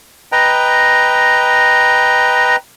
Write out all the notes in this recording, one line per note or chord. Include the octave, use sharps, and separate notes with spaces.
B4 D#5 G5 A#5